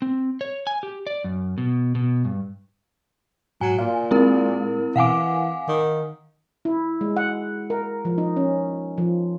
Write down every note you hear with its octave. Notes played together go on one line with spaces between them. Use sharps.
C4
C#5
G#5
G4
D5
F#2
B2
B2
G2
G#2 F#3 G#5
A#2 F5
G#3 C4 E4 A#4
B2 E3 F5 F#5 G#5 D6
D6
D#3
E4
G#3
F#5
A#4
F3
D#4
C#4
F3